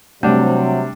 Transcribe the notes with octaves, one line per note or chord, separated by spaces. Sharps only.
C3 F#3 G3 A3 D4